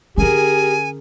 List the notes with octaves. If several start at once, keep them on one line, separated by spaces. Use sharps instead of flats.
D3 C#4 G4 G#4 A#4 G#5